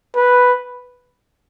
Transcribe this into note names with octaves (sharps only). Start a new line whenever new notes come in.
B4